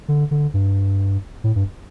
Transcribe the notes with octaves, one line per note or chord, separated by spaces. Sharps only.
D3
D3
G2
A2
G2